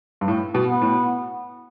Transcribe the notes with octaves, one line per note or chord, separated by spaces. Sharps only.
G2
A2
B2
B3
A2